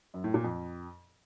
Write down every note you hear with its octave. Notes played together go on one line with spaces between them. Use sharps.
F#2
A2
A#2
F2